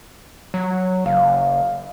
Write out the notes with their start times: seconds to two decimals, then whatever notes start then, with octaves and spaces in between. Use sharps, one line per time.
0.54 F#3
1.06 F#1 F5